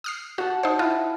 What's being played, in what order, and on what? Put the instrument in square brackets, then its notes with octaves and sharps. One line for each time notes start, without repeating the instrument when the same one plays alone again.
[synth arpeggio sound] D#6 F6 C7
[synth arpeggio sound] F#4 [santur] F#5 A5
[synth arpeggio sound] D#4 C5
[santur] E4 [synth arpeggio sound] F4